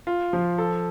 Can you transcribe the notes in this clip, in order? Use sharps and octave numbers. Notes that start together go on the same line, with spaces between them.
F4
F3
A4